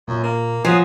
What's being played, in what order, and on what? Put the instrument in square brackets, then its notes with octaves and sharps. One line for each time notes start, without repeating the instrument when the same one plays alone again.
[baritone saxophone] F#2 [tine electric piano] A#2
[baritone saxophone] A#3
[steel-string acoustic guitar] F3 [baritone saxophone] F#3 [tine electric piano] F#5 G#5 C7 [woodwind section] D#6